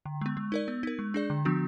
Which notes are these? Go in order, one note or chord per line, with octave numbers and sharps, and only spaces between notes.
D3
G#3 B3
G#3
D#4 A#4 D5
B3
D#4 A#4
G#3
D4 G#4 D5
D3
F3 B3 D4 F#4